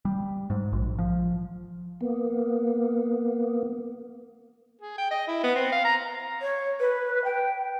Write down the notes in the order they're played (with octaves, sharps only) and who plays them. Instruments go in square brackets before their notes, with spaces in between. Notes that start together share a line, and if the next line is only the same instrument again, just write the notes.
[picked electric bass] G3
G#2
A#1
F3
[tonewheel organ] A#3 B3
[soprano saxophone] G#4
G5
D#5
E4
B3
C4
F5
A#5
[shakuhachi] C#5
B4
G5